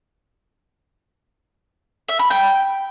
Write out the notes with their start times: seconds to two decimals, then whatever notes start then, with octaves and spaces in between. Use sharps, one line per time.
2.08 E5
2.19 B5
2.30 G5